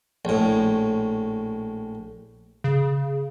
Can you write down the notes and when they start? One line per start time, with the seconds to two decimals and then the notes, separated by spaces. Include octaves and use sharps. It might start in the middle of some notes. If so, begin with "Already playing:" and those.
0.25 A#1 A2
2.64 C#3